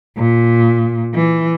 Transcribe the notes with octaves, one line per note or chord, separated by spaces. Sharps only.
A#2
E3